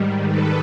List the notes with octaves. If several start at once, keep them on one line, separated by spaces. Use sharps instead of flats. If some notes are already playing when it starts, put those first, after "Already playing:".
Already playing: G#2 D#3 G3
A4 B4